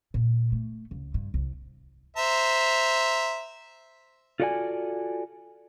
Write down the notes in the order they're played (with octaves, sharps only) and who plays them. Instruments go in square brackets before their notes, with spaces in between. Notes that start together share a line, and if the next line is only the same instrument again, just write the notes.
[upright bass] A#2
A3
C#2
G2
C2
[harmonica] C5 E5 A#5
[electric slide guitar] F4 F#4 A4 D5 E5 G#5